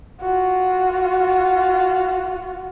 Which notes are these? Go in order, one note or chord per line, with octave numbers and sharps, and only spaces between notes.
F4 F#4